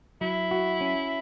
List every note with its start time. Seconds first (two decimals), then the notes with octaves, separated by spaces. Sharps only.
0.21 F#3 E4
0.51 F#4
0.81 C#4